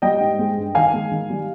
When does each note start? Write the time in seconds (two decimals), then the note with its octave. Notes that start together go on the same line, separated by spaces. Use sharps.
0.02 G3 D#5 G5
0.20 G#2
0.39 G#3
0.57 G2
0.75 D#3 F5 G#5
0.93 G#3
1.11 D#3
1.30 G3